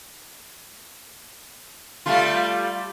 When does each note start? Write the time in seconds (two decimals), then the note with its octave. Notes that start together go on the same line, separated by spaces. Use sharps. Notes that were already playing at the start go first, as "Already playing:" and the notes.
2.06 G3 A3 F4